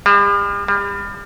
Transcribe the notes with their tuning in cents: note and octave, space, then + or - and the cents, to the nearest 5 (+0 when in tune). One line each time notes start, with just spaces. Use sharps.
G3 +45
G3 +35